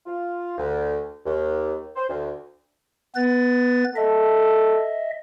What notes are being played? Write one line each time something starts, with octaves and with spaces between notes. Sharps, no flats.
F4
D2
D#2
C5
D2
B3 B4 A6
A4 D#5 E5